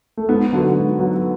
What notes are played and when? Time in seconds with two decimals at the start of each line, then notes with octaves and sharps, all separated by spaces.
0.17 A3
0.29 G#2 B3
0.52 D3 F#3 B3 F#4
0.76 G#2
0.99 F#3 B3 F#4